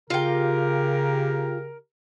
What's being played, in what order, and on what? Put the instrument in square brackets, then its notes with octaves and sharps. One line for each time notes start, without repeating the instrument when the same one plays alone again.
[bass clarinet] C#3 [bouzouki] F4 G5 [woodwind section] G4 A#4